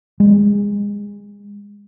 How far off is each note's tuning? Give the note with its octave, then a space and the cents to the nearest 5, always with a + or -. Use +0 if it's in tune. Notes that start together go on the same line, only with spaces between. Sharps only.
G#3 -25